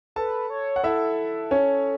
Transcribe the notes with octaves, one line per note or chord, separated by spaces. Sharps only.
A4 B4 A5
C#5
F#5
E4 A4 E5
C#4 C#5